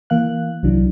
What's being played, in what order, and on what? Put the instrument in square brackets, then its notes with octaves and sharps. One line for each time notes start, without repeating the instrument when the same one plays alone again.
[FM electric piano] E3 A#3 F5 F#6
C2 E3 F#3 D4